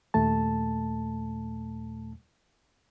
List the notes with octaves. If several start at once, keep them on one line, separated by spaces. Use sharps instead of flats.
D#2 A#2 A3 A5